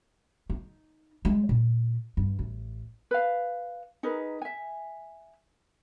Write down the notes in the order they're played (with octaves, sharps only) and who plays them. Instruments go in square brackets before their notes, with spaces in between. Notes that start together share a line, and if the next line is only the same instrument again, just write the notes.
[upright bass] D#4
G#3
A#2
G2
A1
[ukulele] B4 F5
D#4 G#4 A#4 B4
E5 G#5